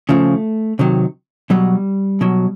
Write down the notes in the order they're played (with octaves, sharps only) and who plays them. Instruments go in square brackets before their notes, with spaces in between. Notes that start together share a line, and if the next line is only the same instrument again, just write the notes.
[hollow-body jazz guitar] C#3 F3 A3
C3 D#3 F#3
B2 F#3 G3
B2 F#3